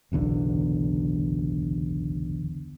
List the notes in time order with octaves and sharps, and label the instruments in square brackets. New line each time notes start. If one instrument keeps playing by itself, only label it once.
[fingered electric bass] F#1 B1 E2 D3